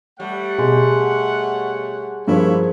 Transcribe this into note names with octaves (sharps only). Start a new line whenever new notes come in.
G3 A3 C#5 F#5
B2 G#4 G#5 C6
G2 F3 E4 F4 G#4 A#4 C5 C#5